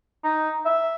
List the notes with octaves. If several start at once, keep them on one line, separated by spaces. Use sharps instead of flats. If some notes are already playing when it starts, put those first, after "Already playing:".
D#4
E5